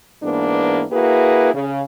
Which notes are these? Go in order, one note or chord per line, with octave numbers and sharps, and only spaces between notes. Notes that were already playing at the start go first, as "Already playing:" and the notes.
G#2 E3 A#3 B3 D4
A#3 E4 F#4 G#4 B4
C#3